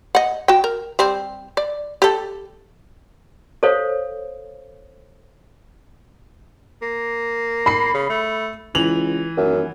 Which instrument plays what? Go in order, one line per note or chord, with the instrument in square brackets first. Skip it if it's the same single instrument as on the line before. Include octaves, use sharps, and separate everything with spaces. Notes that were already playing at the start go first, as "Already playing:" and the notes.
[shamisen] D#5 F#5
F#4 G5
A#4
G3 C4
D5
G4 A4
[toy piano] A4 C5 C#5 F5
[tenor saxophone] A#3
[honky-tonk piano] B5 C7
[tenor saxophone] C#3
A3
[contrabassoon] C#2 [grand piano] E3 F7 F#7
[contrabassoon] D#1 [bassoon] F#2